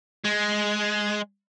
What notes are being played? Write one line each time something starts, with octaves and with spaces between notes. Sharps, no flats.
G#3